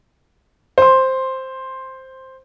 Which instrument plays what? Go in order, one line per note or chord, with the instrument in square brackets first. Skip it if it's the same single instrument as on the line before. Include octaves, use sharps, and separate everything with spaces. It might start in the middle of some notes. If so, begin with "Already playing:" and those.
[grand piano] C5 C6